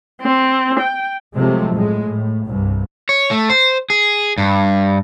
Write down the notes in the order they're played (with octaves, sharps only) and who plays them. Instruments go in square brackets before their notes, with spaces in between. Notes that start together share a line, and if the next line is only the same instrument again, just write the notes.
[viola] C4
G5
[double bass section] C3 F3 F#3 G#3 A3 C4
A2 G#3
A2
C2 G2
[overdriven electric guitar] C#5
A3
C5
G#4
G2